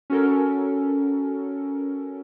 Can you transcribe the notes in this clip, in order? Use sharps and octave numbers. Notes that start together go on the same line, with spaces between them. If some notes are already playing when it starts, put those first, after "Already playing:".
C#4 F#4 A4 A#4